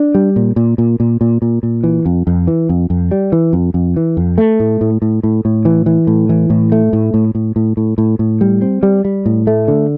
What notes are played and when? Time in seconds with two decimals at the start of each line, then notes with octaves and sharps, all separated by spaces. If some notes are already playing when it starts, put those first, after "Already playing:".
Already playing: D4
0.15 G3
0.36 A#2
0.56 A#2
0.78 A#2
1.00 A#2
1.21 A#2
1.42 A#2
1.63 A#2
1.84 E3
2.06 F2
2.27 F2
2.47 E3
2.69 F2
2.90 F2
3.11 G3
3.32 E3
3.53 F2
3.74 F2
3.96 E3
4.17 F2
4.38 A3
4.60 A2
4.81 A2
5.02 A2
5.23 A2
5.45 A2
5.65 E3
5.86 E3
6.07 A2
6.29 E3
6.50 A2
6.72 A3
6.93 A2
7.14 A2
7.35 A2
7.56 A2
7.77 A2
7.98 A2
8.19 A2
8.41 G3
8.62 C4
8.83 G3
9.05 G3
9.26 A2
9.47 A3
9.68 D3